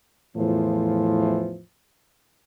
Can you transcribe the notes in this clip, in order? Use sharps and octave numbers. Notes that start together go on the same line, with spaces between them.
E2 A2 E3 F3